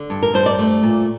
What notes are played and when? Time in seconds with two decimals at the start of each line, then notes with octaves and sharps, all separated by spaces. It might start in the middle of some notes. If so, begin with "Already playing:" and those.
Already playing: D3
0.10 G2
0.23 A#4
0.34 G2 C5
0.46 D5
0.59 A3
0.83 A#2